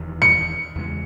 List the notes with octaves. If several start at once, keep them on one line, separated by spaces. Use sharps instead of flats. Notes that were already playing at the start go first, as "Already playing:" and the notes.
Already playing: E1 E2 D#3
C#7
E2 C#3 G#3